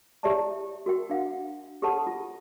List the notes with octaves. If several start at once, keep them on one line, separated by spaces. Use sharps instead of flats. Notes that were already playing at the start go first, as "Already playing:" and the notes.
E4 G4 C#5 D5 E5 A5
F#4 A#4 G5
D4 F5 F#5
G4 A4 B4 C#5 F#5 A5
F4